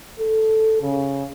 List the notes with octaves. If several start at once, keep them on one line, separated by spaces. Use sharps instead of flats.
A4
C#3